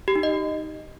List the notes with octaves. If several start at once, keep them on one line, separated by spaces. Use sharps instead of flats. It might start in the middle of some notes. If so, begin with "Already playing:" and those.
G4
D#4
D#5